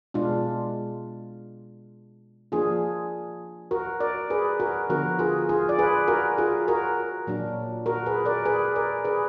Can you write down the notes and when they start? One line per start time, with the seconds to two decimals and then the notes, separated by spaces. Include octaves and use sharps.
0.14 B2 G#3 D4 F4
2.52 F3 A#3 D4 F4 G#4
3.71 F#4 A#4
4.00 A#4 D5
4.30 G#4 B4
4.60 F#4 A#4
4.90 D3 F3 B3 F#4 A#4
5.19 F4 G#4
5.49 F4 G#4
5.69 D5
5.79 G#4 B4
6.08 F#4 A#4
6.38 F4 G#4
6.68 F#4 A#4
7.27 A#2 F#3 D4
7.86 F#4 A#4
8.06 G#4 B4
8.26 A#4 D5
8.45 G#4 B4
8.76 A#4 D5
9.05 G#4 B4